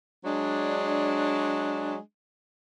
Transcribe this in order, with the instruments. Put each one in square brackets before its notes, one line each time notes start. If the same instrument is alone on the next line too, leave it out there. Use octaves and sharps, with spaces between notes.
[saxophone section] F#3 G#3 D4